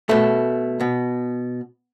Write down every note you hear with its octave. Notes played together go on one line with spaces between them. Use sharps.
B2 A3
B2